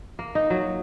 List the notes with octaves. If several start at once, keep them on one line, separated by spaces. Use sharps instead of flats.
A#3
D#4
F#3